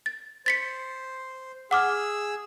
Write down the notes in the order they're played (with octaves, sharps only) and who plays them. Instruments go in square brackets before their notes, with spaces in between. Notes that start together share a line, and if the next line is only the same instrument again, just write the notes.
[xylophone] A6
[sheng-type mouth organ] C5 [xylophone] A6 B6 C#7
[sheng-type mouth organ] G#4 E6 [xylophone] F#5 D6 F6